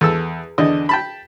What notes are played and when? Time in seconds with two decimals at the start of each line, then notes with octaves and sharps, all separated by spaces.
0.01 E2 A4 E6
0.58 E2 D3 D4 D#5
0.89 G5 A5 B5